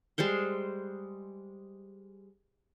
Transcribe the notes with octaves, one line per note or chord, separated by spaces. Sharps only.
G3 G#3 C5 C6